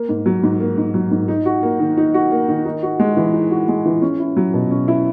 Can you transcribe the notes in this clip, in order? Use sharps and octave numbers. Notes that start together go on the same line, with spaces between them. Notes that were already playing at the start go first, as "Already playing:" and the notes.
Already playing: A#3
G#2
F#3
G#2
A#3
G#2
F#3
G#2
D#4
F#4
A#3
D#3
D#4
F#4
A#3
D#3
D#4
F#4
G#3
E3
D#4
F#4
G#3
E3
C#4
E4
F#3
B2
C#4
E4